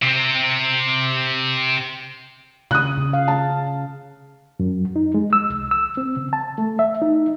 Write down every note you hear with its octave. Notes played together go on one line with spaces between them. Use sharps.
C3 C4
C#3 D#6 F#6
C#3
F5
A5
F#2
D#4
G#3
E6
C2
E6
C4
C#3
A5
A3
E5
D#4